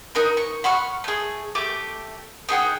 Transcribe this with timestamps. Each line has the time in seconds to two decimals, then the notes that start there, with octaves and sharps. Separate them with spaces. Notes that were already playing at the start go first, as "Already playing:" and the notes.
0.15 D#4 A#4 B4
0.37 C#6
0.64 F#5 B5 C#6 F6
1.04 A3 G#4
1.55 A3 G4 D6
2.49 D#4 G#4 F#5 G5